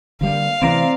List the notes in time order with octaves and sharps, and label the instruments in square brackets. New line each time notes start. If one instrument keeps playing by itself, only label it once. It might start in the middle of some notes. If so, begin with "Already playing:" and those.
[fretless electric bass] D3 G3 A#3 [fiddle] F5
[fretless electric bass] C3 E3 A3 [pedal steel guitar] C4 D5 A#5